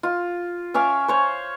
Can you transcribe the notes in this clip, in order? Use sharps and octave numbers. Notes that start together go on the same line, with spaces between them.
F4
C#4 E5 F5 D6
C5 C#5